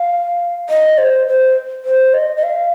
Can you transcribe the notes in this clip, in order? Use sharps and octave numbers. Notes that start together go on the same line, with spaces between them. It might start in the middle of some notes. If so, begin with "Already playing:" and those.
Already playing: F5
D#5
C5
C5
C5
D#5
D#5
F5